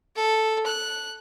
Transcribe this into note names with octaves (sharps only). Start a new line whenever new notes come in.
A4
F#6